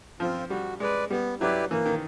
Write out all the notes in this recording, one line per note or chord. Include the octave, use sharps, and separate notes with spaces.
F3 C4 F4
G3 F#4
G#3 B4 D5
G3 B3
F#3 E4 G4 B4 D5
E3 A#3
D#3